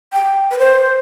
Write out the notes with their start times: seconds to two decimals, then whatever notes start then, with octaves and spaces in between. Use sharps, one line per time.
0.13 G5
0.51 B4
0.59 C5